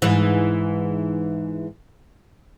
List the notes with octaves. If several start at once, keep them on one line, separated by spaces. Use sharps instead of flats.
G#2 E3